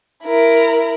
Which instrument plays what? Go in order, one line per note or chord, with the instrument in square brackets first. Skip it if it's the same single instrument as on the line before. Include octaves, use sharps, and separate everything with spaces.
[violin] E4 A#4